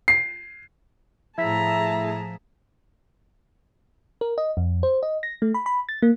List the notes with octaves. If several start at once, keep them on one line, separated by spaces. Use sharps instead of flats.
C7
A2 F3 E4 G#4 E5 A5 A#5
A#4
D#5
F2
C5
D#5
A#6
A3
B5
B5
A6
A#3